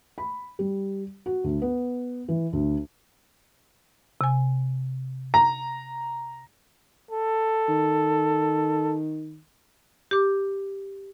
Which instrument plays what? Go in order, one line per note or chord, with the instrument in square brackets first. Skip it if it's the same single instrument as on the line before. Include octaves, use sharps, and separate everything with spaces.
[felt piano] B5
G3
F#4
D2
B3
E3
D2
[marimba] C3 G#5
[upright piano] A#5
[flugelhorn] A4
[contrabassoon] D#3
[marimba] G4 D6